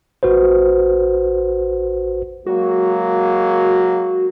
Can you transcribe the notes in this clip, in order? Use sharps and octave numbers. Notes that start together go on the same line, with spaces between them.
A1 F#4 B4 C5
F#3 G#3 A#3 F#4